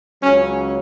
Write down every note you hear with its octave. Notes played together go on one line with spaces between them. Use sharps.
C#2 C#3 F#3 C#4